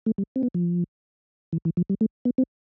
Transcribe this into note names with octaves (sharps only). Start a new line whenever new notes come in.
A3
G3
C4
B3
F3
E3
E3
F3
G3
A3
B3
C4